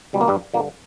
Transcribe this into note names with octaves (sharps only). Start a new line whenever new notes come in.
C#2 B2 G3
A#3
G2 G3
G2 A#2 D3 A#3